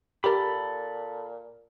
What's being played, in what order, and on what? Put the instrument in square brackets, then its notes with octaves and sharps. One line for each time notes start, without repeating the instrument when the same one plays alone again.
[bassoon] A#2 [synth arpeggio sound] G4 A#4 [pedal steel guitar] A4 B5